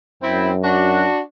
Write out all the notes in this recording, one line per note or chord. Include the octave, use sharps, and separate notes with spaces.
F#2 C4 E4
D4 F#4